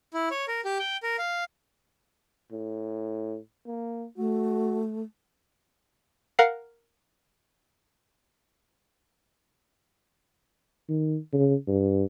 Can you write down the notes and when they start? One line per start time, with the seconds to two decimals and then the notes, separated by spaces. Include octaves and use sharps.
0.14 E4
0.31 C#5
0.48 A#4
0.65 G4
0.79 G5
1.03 A#4
1.18 F5
2.52 A2
3.67 A#3
4.18 A3 F#4
6.39 A#4 F5 F#5 C7
10.89 D#3
11.33 C#3
11.68 G2